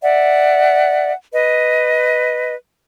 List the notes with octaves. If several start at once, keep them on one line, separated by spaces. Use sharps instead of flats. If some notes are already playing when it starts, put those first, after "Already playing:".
D5 E5 F#5
B4 D#5